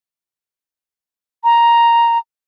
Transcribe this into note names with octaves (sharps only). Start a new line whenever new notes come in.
A#5